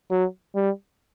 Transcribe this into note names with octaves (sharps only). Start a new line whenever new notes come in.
F#3
G3